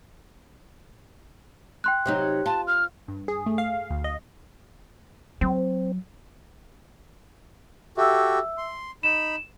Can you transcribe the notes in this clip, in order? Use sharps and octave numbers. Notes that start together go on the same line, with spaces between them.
G5 C6 F#6
C3 F#3 D#4
F4 A5
F6
G2
G#4
A3
F5
D2
D#5
F#3 C4
F#4 G4 A4 E5 E6
C6
D#4 B5 E7